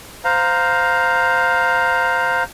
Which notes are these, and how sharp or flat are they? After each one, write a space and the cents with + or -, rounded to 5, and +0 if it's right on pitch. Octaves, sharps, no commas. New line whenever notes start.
C5 -10 F5 +10 A#5 +0